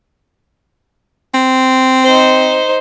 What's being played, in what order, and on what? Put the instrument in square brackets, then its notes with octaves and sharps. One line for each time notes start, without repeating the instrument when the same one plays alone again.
[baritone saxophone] C4
[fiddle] D#4 C5